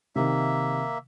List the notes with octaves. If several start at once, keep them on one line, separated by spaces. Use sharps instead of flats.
C3 D#3 A#3 E5